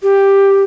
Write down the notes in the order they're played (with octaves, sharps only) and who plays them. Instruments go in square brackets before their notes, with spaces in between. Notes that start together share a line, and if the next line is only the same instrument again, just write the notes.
[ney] G4